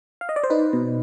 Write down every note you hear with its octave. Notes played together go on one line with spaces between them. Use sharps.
F5
D#5
D5
C5
D#4 B4
B2